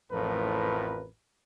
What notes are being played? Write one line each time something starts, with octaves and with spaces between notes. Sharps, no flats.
A1 F2 A2 F3 A#4 B4